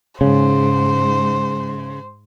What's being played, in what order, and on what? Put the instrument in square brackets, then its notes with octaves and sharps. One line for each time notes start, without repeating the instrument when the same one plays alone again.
[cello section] G#2 [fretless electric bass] C#3 [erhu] C5